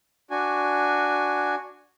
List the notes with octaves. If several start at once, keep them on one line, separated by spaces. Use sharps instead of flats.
D4 F#4 G#5